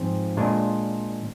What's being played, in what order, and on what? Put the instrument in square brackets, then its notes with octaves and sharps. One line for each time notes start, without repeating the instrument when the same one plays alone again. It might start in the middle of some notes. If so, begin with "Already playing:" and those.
Already playing: [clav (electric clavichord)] G#2 F3 C4 F4
A#2 G#3 D4 F4